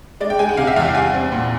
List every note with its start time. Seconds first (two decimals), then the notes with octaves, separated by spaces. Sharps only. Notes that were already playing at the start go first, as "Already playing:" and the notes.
0.20 G#3 D5
0.30 G5
0.39 G#3 G#5
0.49 F#5
0.57 C3 F5
0.67 E5
0.76 E2 F5
0.85 G5
0.94 G3 G#5
1.14 C4
1.32 A#2